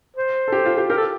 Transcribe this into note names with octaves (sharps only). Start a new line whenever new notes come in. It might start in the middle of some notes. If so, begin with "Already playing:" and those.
C5
A4
G4
F4
G4
G4 A#4
A4